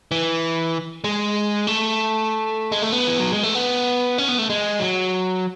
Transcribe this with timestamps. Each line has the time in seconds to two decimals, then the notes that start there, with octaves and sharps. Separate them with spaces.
0.11 E3
1.04 G#3
1.67 A3
2.72 G#3
2.82 A3
2.92 B3
3.07 E3
3.20 F#3
3.31 G#3
3.43 A3
3.55 B3
4.18 C#4
4.29 B3
4.38 A3
4.50 G#3
4.80 F#3